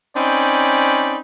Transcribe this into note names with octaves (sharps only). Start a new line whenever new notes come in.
C4 C#4 D#4 D5 B5